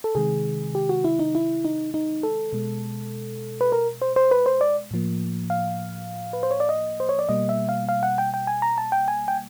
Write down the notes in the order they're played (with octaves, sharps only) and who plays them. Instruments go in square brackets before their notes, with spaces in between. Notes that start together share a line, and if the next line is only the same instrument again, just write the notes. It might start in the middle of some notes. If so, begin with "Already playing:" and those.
[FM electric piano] A4
C3 D#3 G#3 G#4
G4
F#4
E4
D#4
E4
D#4
D#4
A4
B2 G#3
B4
A#4
C5
C5
B4
C5
D5
A2 F3 A#3
F5
B4
C5
C#5
D5
D#5
C5
C#5
D5
B2 G3 A#3 D#5
E5
F5
F5
F#5
G5
G5
G#5
A#5
A5
G5
G#5
G5